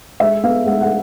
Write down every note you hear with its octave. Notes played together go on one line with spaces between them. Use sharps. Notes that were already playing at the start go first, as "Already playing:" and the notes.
G#3 E5
B3 F5
G#3 F#5
F#5